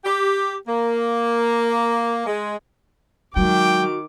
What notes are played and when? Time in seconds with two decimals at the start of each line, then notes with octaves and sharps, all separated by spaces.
0.05 G4
0.68 A#3
2.26 G#3
3.36 D#3 F#3 G#3 F#4 G5 D6